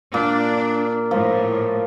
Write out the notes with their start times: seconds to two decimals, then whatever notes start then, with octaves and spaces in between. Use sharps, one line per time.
0.14 A#2 D4
1.11 A2 F3